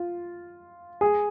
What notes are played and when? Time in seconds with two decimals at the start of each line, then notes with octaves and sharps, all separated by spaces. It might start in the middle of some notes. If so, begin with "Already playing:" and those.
Already playing: F4
1.01 G#4